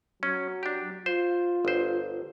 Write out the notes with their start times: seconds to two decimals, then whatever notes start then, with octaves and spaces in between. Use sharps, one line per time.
0.23 F#3 C#4
0.63 D4 G4
1.06 F4 C5
1.65 G1 C5